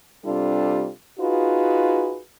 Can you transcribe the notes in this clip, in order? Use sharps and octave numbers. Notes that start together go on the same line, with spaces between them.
C3 G3 D4 F4 A4
D#4 F4 F#4 G#4 B4